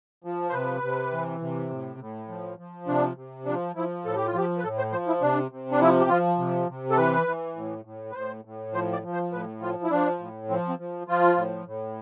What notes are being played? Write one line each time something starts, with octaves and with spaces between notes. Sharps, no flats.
F3
C5
C3 B4
C3
E3
C3
A2
A2
F3
F3
C3 D4
C3
F3 D4
F3 E4
A2 A4
G4
F4
F3 G4
B4
A2 A4
C5
F3 C5
E4
C3 D4
C3
D4
F3 E4
G4
F3 F4
C3
C3
A4
E3 B4
E3
A2
A2
B4
A2 C5
A2
F3 C5
D5
F3
C5
A2 B4
F3 F4
E4
F3 D4
A2
F3 C4
C4
F3
F3 F4
A2
A2